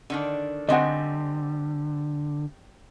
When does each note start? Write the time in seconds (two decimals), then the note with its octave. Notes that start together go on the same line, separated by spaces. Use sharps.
0.10 D3 D#3 D4
0.69 D3 G3 C4 D#5 F#5 G#5